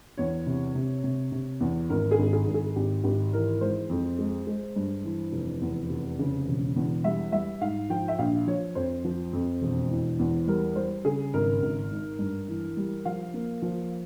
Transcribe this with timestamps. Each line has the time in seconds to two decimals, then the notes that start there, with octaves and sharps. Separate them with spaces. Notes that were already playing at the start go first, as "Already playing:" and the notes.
0.17 E2 C#5
0.47 C3
0.75 C3
1.04 C3
1.32 C3
1.60 E2
1.90 G#1 A#4
2.11 G#4
2.19 G#1
2.33 G#4
2.47 G#1
2.54 G#4
2.76 G#1 G4
3.04 G#1 G4
3.33 E3 A#4
3.61 G#3 C5
3.90 F2
4.19 G#3
4.47 G#3
4.76 G2
5.04 E3
5.32 F1
5.61 E2
5.90 F1
6.19 C#3
6.47 E1
6.76 E2
7.04 G3 E5
7.32 G3 E5
7.61 G#2 F5
7.90 F3 G5
8.08 E5
8.19 A#1 F5
8.47 F3 C#5
8.75 F2 C5
9.05 F3
9.33 F2
9.61 E1
9.90 E3
10.19 E2
10.47 G3 A#4
10.76 G3 C5
11.05 C#3 G#4
11.34 G#1 A#4
11.62 G#1
11.91 G#2
12.19 G2
12.48 E3
12.77 G3
13.05 F3 F5
13.34 A#3
13.62 F3